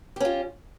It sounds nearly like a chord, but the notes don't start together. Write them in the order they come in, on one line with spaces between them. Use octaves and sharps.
G4 C#4 F4